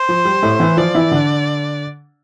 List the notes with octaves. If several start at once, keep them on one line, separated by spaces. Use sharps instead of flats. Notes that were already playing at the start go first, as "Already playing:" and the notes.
Already playing: C5
F3
G3
A2 A3
E3 E4
F3 F4 D5
E3 E4
D3 D4